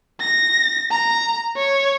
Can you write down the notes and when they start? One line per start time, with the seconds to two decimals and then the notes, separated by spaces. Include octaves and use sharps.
0.21 A#6
0.92 A#5
1.57 C#5